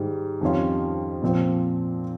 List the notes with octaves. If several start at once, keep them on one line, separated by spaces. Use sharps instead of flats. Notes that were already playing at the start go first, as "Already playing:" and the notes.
Already playing: G#2 D#3 G3
F2 D#3 G3 C#4 F4
A#2 F3 C4 F4